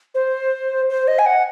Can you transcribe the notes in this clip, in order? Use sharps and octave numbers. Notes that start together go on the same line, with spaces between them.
C5
C5
D#5
G#5
F#5